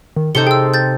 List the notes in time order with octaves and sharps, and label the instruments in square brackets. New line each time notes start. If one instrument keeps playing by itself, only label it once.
[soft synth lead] D#3
[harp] C3 [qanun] D#4 A4 C6 [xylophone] G6 G7 [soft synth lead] C#7
[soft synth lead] G#4 [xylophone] G5 E6
[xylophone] G6 A6